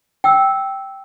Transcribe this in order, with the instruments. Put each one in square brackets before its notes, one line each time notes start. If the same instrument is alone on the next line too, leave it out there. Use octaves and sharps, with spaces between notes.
[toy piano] G5 E6